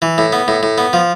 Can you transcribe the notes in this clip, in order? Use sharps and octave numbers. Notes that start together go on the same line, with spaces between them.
E3
A2
B3
A2
A2
B3
F3